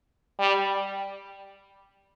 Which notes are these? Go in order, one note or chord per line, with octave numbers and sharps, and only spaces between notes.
G3